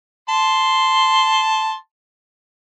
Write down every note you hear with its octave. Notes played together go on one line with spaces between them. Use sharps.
A5 C6